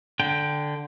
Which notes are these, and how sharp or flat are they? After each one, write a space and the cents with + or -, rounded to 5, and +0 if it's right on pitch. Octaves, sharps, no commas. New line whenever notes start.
D3 +0 G5 +10